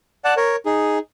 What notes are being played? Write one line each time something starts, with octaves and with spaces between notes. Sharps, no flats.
D5 F#5 A5
A#4 C#5
D#4 G#4